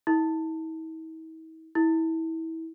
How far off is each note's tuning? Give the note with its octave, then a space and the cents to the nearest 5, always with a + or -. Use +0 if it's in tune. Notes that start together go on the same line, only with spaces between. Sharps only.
E4 -45
E4 -25